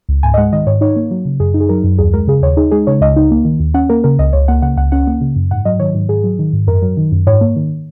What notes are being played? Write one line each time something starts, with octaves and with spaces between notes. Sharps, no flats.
C#2
G#2 G#5
D#5
G#3 F#5
D#3 D#5
G#2 C#5
D#4 C#5
A#3
F#3
C#3
F#2 G#4
D#4
G#4
F#3 A#4
F#2
D#2 G#4
G#3 A#4
C#3 G#4
D#2 C#5
D#4 G#4
G#3 G#4
C#3 C#5
C#2 D#5
D#4
A#3
D#3
D#2
C#4 F#5
A#3 A#4
C#3 A#4
C#2 D#5
C#2 C#5
A#3 F#5
C#3 F#5
C#2 F#5
C#4 F#5
A#3
C#3
F#2
G#2 F#5
F#3 D#5
D#3 C#5
G#2
G#2 G#4
F#3
D#3
G#2
F#2 A#4
F#3
D#3
F#2
G#2 C#5
A#3
D#3